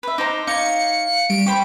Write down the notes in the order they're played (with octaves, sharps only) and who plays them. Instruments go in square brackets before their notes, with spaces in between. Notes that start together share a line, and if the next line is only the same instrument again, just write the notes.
[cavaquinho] B4 E5
[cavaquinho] D#4 C5 A#5 [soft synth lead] D6
[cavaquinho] D#4 C#5 [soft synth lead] F5 [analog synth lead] C#7
[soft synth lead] G3 [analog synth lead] D7
[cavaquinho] G4 C5 B5 [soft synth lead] C#6